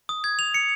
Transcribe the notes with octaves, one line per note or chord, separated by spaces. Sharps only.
D#6
G#6
F7
C#7